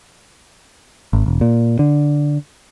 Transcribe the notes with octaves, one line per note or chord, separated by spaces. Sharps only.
G#1
E1
A#2
D3